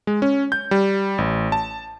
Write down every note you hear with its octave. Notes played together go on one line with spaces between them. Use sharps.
G#3
C#4
G6
G3
A1
A5